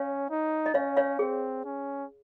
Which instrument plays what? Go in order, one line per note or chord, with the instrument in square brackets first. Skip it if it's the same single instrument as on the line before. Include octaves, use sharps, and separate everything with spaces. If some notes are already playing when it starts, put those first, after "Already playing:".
Already playing: [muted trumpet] C#4 [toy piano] C#5 F5
[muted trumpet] D#4
[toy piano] D#5
[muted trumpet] C#4 [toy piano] C#5 F5
[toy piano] C#5 F5
[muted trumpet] C4 [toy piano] G#4
[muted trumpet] C#4